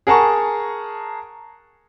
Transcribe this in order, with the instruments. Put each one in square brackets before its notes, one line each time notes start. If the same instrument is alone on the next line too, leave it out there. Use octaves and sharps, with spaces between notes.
[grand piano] G#4 A#4 F#5 A5 A#5 C#6